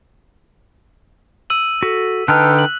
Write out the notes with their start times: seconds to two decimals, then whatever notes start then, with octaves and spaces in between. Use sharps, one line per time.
1.50 E6 D#7 F#7
1.83 F#4 A4 B6
2.28 D3 D#4 A4 B4 G5 F6 F#6
2.59 F#7